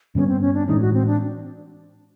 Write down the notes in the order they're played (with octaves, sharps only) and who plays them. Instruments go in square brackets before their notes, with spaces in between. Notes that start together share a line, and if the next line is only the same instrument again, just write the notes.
[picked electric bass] G2 D3 G3 B3 [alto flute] C#4
[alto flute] C4
C#4
D4
[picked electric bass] A2 E3 G#3 C#4 [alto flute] D#4
[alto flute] F#4
C4
D4